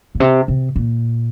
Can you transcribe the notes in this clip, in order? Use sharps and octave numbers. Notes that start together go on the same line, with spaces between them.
A#2
C3
C3
A#2